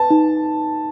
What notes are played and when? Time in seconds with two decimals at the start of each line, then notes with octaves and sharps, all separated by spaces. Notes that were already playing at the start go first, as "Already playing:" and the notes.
Already playing: B4 A5
0.10 D#4